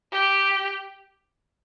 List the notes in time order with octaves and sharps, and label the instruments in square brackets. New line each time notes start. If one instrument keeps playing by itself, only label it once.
[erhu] G4